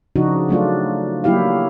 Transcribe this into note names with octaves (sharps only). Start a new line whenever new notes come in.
C#3 F3 D4 D#4 F#4
F#3 A3 D4 F4
F#3 A#3 E4 G4 F5